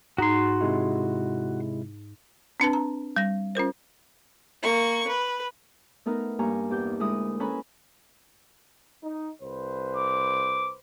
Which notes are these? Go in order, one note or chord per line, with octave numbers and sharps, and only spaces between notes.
G#2 D#4 F#4 A#5 C6
C3 G#3 E4
C4 D4 B4 A5
A#5
G3 A#6
C#4 F4 A#4 C5
A#3 C#6
B4
A3 B3 D#4 A#4 B4
G2 A#3 G#5 A#5 C#6
E2 G4 G6
D#4
D2 G#3 E4 A#4 D#6
C#4 A4 B4 G#5 A#5 B5
D#4
C2 B4 C5
D6